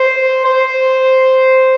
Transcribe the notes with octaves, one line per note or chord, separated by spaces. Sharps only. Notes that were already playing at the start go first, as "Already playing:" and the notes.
Already playing: C5
C5